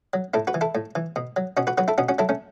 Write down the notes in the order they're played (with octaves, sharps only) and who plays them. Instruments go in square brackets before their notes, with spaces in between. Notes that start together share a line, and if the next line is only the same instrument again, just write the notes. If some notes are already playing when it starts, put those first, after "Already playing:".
[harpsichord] F#3
A2 E4 A4
F#4 B4
E3
E4 A4
A2
E3
B2
F#3
B2 C#4 F#4
F#4 B4
F#3 F#4 B4
E4 A4
B2 C#4 F#4
C#4 F#4
F#3 E4 A4
A3 C#4